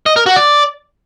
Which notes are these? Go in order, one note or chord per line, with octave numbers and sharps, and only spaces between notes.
D#5
A#4
F#4
D5